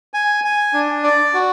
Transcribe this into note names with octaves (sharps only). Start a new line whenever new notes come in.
G#5
G#5
D4
D5
F#4